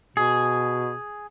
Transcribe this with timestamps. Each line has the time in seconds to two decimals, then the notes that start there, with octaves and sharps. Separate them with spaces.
0.17 B2 G#4